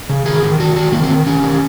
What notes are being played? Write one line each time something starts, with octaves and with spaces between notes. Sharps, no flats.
C#3
D#3 G#4
D#3
D#3 F#4
D#3 F#4
D#3 A#3
C4
D#3
D#3 C#4
D#3